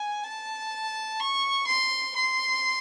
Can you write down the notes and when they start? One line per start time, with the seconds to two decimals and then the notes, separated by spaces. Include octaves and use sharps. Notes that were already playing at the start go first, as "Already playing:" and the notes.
Already playing: G#5
0.23 A5
1.20 C#6
1.67 C6
2.16 C6